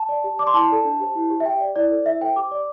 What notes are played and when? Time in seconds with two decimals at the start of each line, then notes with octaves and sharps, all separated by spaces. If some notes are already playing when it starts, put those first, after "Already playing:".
Already playing: A5
0.09 D5
0.24 G4
0.39 D5 D6
0.47 C6
0.54 E4 A5
0.69 A4 D5
0.85 D4
1.00 G4 C5
1.15 E4
1.30 G4 C5
1.40 E5
1.45 G4 G5
1.61 D5
1.76 E4 D5
1.91 A4 C5
2.06 E4 E5
2.21 A4 C5 G5
2.36 G4 D6
2.51 D5